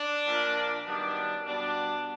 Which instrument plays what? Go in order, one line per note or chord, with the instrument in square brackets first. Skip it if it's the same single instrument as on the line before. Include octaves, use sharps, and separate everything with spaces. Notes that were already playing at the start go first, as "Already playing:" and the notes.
Already playing: [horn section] D4
A#2 F3 A#3
F#2 D#3 G3 B3 D4
B2 G3 B3 D4